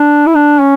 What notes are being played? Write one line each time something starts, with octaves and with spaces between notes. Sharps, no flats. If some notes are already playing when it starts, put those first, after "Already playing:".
Already playing: D4
E4
D4
C#4